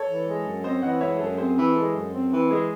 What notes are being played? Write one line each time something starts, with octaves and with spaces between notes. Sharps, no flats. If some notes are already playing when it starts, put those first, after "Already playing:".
Already playing: A4 C#5
E3
G#3
F#2
C4 C5 D#5
E3 D#5 F#5
G#3 C#5 E5
G#4
F#2 A4
C4 G#4 C5
E3
G#3 A4
F#2
C4
E3
G#3 G#4